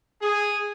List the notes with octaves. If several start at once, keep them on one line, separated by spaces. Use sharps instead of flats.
G#4